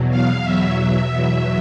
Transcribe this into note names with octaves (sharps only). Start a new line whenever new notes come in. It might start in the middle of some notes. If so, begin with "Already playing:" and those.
Already playing: E2 B2 F#3
F5
E2 B2 F#3 E5
E5
E2 B2 F#3